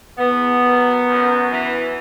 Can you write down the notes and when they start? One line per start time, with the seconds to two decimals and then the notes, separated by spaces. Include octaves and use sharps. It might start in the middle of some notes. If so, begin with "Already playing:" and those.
0.19 E2 B3
0.62 D#3 F#3
1.07 F#2
1.50 E3